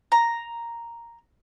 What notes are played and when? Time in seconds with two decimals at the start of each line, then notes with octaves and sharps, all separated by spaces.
0.12 A#5